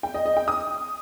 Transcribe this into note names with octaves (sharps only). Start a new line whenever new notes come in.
G5
D#5
D#5
G5
D#6